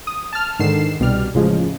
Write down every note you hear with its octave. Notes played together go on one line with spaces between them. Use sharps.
D#6
A5 F6
G#2 D3 D#3 C7 E7
C2 B2 G3 G4 D5 F6
A1 C#3 F3 G#3